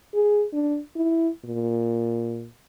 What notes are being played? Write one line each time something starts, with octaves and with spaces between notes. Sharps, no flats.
G#4
D4
E4
A#2